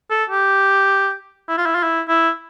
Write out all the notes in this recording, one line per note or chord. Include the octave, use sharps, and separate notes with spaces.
A4
G4
E4
F4
E4
F4
E4
E4